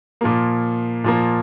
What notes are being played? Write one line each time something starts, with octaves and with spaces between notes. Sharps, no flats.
A#2 F3 A#3
A#2 F3 A#3